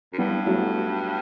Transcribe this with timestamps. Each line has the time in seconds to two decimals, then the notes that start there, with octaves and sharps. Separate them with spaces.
0.13 F#2
0.18 G2 G3 B3
0.46 F#3 A3